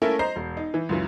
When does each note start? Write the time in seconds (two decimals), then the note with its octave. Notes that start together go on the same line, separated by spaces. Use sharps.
0.02 A3 A#3 C#4 E4 A4 A#4
0.19 C5 D#5 A#5 G6 C7
0.36 E1
0.57 D#4
0.74 E3
0.89 C#2 F#2 E3